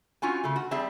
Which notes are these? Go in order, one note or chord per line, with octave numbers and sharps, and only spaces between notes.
C4 C#4 F4 F#4 G#5
C#3 A3
F#4
G3 C4 G#4 E5 A5